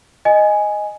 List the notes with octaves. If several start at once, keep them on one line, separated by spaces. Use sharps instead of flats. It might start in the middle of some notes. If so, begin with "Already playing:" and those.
D#5 G#5